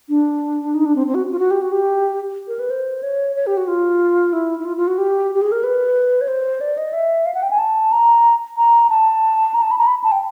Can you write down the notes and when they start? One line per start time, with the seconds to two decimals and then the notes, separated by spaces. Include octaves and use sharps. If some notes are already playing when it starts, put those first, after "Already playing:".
0.09 D4
0.74 D#4
0.85 D4
0.95 C4
1.07 C4
1.14 F#4
1.31 F4
1.39 F#4
1.51 G4
1.61 F#4
1.72 G4
2.48 A#4
2.59 B4
2.70 C5
3.03 C#5
3.35 C#5
3.46 G4
3.57 F#4
3.67 F4
4.33 E4
4.60 E4
4.65 F4
4.77 F4
4.87 F#4
4.98 G4
5.35 G4
5.41 G#4
5.52 A#4
5.63 B4
6.21 C#5
6.28 C5
6.61 D5
6.77 D#5
6.93 E5
7.26 F5
7.34 F#5
7.42 G5
7.50 G#5
7.58 A5
7.92 A#5
8.57 A#5
8.90 A5
9.54 A#5
9.62 A5
9.71 B5
9.78 A#5
9.87 B5
10.04 A5
10.12 G5